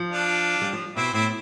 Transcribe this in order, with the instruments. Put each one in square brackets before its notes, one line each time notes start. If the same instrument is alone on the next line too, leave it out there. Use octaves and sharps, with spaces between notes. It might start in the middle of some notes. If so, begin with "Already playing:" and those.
Already playing: [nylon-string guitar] F3
[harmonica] D4 F4
[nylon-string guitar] G3
F3
[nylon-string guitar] B2 [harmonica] C4 E4
[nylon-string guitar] A2 [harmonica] C4 E4